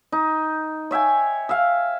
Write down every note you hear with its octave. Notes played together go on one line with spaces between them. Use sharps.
D#4
C#5 E5 G5 G#5
E5 F5